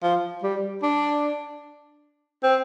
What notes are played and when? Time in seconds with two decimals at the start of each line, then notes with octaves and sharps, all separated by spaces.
0.03 F3
0.43 G3
0.82 D4
2.43 C4